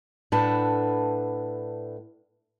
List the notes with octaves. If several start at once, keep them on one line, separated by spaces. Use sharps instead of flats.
A2 A3 D4 B4 F#5 A5